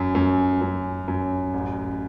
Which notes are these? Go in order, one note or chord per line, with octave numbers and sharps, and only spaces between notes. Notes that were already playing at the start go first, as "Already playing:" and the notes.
Already playing: F#2
F#2
F#2
F#2
A1